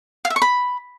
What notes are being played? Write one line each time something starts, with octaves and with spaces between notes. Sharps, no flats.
F5
E5
C#6
B5